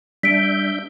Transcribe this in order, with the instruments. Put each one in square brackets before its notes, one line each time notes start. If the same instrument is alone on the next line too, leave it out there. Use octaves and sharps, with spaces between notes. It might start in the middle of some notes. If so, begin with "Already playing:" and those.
[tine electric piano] G3 [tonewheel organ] D4 E5 G6 [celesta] B6 D7